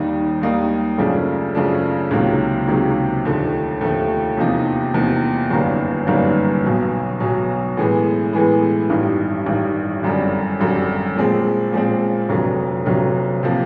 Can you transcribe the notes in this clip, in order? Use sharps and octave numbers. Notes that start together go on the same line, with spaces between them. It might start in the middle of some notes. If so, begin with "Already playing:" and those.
Already playing: D#2 D#3 G3 A#3 D#4
D#2 D#3 G3 A#3 D#4
F#2 C#3 F3 A3 D4
F#2 C#3 F3 A3 D4
C#2 C3 D#3 F#3 A#3
C#2 C3 D#3 F#3 A#3
D#2 D3 F3 A3
D#2 D3 F3 A3
E2 C3 F3 A#3 D#4
E2 C3 F3 A#3 D#4
G1 F#2 D#3 G3 A#3
G1 F#2 D#3 G3 A#3
B1 B2 F#3
B1 B2 F#3
A2 E3 G#3 B3
A2 E3 G#3 B3
A1 G2 D#3
A1 G2 D#3
G#1 F#2 D3 G3
G#1 F#2 D3 G3
A#2 F3 G#3 C4
A#2 F3 G#3 C4
F1 F2 D3 F#3
F1 F2 D3 F#3
C3 F3 A#3